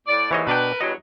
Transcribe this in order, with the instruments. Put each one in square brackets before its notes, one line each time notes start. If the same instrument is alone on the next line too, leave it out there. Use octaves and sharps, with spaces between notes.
[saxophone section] A2 D5
[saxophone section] D#2 G#2 [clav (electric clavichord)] E3 C#5 D#5
[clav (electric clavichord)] B2 D4 G5 [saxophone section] A#4 B4
[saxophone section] E2 G2 F#3 [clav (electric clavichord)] D#5